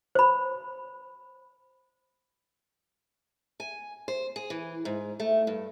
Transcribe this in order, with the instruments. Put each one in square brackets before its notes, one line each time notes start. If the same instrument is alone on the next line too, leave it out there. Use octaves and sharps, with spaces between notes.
[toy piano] C5 B5
[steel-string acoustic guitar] G#5
C5
G#4
E3
G#2
A3
G2